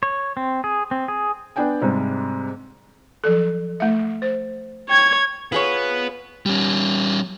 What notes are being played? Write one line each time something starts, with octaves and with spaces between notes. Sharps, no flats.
C#5
C4
G#4
C4
G#4
B3 D4 D5 G5 G#5
G#2 C3 G3 G#3
F3 F#3 A4
A3 E5
C5
C#5 G5 G#6
B3 F4 G#4 C#5
G3 C#4